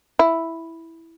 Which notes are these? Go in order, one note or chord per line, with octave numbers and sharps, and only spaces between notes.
E4